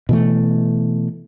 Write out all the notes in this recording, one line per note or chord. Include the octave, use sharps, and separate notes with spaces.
B2 E3 A3